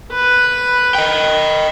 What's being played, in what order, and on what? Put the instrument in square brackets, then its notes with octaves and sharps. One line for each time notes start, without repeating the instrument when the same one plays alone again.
[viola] B4
[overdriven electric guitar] D#5 G5